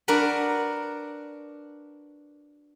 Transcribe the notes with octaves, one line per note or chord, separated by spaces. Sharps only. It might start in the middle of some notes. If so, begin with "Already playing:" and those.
D4 F#4 A#4 B4